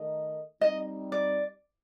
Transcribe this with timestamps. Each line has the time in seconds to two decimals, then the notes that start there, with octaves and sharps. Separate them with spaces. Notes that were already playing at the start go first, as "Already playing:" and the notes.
Already playing: D#3 A3 D#4 A#4 D#5
0.61 G3 C4 D#4 D#5
1.12 D5